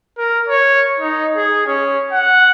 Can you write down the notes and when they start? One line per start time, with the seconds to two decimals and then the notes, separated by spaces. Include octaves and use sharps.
0.17 A#4
0.48 C#5
0.99 D#4
1.36 G#4
1.67 C#4
2.12 F#5